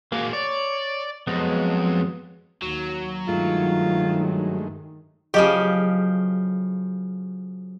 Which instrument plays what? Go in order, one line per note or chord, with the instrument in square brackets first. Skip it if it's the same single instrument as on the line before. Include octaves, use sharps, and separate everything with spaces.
[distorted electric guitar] G#3 F#4 [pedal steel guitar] A#3
[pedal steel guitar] C#5 [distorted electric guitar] D5
[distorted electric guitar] F2 [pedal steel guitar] F#3 G#3 B3
[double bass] D#2 [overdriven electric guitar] F#3
[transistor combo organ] G2 G#3 A3 [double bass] D#3 [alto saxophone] F4
[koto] C#3 F3 G4 [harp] F#3 A3 [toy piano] G#4 D#5 D6